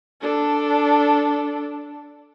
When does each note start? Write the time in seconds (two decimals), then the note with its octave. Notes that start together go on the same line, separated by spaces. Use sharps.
0.21 D4 A4